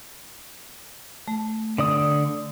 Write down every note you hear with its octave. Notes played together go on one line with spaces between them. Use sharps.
A3
D3 D5 D#6